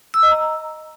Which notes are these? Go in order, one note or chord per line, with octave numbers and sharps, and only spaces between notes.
E6
D#5
A#5